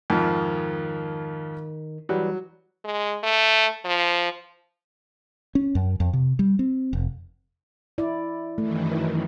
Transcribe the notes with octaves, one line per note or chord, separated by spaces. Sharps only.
F2 G#2 D#3 F3
E3 F#3 G3
G#3
A3
F3
C#4
F#2
F2
C3
G3
C4
F1
E4 D5
F#2 D#3 E3 A3